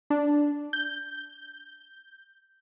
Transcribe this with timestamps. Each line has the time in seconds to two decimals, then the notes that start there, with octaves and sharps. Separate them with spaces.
0.10 D4
0.73 G6